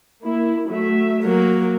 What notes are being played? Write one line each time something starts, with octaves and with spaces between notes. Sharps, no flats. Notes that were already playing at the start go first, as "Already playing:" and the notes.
A#3 E4
F#3 A3 E5
F#3 A#3 A#4